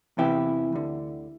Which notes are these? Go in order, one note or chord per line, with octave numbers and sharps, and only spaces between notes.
E2 C3 E3 E4 G4
D2 D3